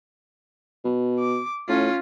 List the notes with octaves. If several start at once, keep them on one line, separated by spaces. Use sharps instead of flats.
B2
D6
A2 C#4 F4